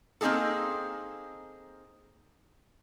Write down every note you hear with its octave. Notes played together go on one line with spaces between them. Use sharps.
A#3 C4 C#4 D#4 G#4 A4